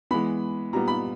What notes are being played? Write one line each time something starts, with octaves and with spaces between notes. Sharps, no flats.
E3 G#3 B3 B5
A#2 G3 B3 A#5
B5